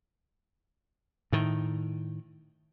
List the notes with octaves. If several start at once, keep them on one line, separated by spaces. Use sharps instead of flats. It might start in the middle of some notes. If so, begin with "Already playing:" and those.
A2 D#3